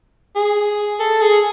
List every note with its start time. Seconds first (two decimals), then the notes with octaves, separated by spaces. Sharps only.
0.36 G#4
1.00 A4
1.21 G#4